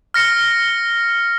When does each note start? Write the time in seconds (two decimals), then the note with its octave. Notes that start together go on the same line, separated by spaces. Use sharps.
0.14 F6 A#6 C#7